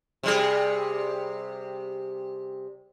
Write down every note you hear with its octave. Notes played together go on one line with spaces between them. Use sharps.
C3 G3 G#4